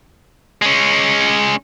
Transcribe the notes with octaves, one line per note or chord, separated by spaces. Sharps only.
G#3 C#4